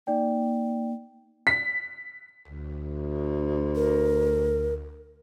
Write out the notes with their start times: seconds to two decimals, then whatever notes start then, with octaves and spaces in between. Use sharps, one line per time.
0.07 A#3 D#4 D5 G5
1.47 B6
2.48 D2
3.76 A#4